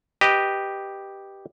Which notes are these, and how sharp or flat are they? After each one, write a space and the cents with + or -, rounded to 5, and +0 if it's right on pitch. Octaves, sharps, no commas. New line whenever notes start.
G4 +0 B4 -5 D#5 +0